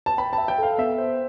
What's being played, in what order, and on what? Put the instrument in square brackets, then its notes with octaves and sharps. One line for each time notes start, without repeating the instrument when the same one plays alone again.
[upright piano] A5
[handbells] G5 [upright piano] B5
[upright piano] A5
[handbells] E5
[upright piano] G5
[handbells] A4 [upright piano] F5
[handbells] B3 [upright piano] E5
[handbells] C5